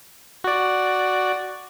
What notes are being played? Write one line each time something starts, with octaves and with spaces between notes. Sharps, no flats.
F#4 D5